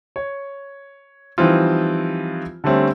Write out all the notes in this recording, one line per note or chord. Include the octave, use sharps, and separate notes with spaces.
C#5
E3 F3 G3 C4 D#4 F4
D3 G3 A3 C4 C#4